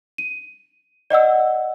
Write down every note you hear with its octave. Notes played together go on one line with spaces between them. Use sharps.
D#7
D5 D#5 F#5 E6